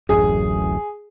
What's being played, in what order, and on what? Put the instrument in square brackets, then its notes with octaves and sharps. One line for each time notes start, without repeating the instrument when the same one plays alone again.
[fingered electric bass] D1 A1 F#2 [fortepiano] G#4